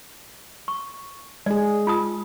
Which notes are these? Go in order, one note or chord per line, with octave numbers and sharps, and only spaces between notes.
C#6
G#3 G#4 D5
F4 A5 D#6